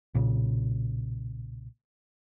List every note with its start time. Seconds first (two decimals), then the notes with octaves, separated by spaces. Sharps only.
0.14 B1 A#2 C#3